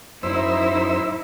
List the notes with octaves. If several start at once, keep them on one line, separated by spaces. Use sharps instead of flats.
F#2 D#4 E4 C5 E6